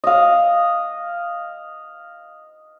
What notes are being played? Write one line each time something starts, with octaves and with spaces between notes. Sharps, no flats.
D#5 F5